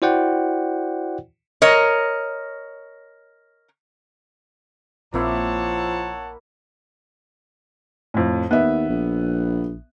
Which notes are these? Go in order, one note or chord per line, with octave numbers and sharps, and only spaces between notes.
E4 F#4 C5 D5 F#5 G5
A#4 C#5 D#5
A#1 F3 A#3 C4 E4 C#5 F#5 A5
F2 A2
D#2 B3 E5
A#1